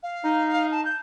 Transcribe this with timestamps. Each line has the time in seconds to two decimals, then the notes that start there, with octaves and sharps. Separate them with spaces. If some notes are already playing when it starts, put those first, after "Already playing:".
0.03 F5
0.24 D#4
0.71 A5
0.85 G6